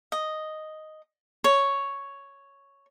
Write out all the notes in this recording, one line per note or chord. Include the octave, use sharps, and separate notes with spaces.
D#5
C#5